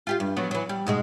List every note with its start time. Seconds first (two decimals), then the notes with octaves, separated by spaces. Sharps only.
0.07 F4 G4 F5
0.20 G2
0.36 F3 F#3 B3
0.51 E3 F#3
0.69 G3
0.87 G#2 B2 G#3